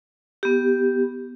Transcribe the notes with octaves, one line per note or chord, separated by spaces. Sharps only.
B3 G4